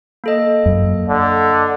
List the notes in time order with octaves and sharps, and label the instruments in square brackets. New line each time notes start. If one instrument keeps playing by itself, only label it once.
[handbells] A#3 A4 D#5
[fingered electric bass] F#2
[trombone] D3